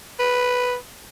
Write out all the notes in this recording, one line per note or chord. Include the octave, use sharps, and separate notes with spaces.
B4